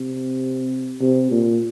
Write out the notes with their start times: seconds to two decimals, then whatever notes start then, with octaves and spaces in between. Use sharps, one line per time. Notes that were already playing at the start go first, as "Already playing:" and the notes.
Already playing: C3
1.01 C3
1.31 A#2